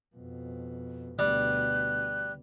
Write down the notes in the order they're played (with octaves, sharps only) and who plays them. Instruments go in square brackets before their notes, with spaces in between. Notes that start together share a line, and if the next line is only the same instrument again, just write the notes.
[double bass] F2 B2
[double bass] D2 B2 [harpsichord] G3 [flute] F#6